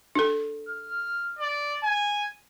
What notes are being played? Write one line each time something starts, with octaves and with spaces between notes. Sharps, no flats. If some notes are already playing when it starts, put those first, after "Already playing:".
D4 A4
F6
D5
G#5